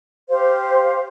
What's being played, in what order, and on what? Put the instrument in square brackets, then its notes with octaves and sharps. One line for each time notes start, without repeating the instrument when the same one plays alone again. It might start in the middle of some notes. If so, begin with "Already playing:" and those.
[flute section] G4 C5 F5